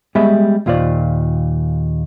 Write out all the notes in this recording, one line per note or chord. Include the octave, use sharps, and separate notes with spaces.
G3 G#3 B3 E5 B5
D#2 A#2 F4 C5 D5